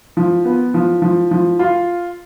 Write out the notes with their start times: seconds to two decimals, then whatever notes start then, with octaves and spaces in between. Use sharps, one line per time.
0.17 F3
0.45 B3
0.74 F3
1.02 F3
1.31 F3
1.59 F4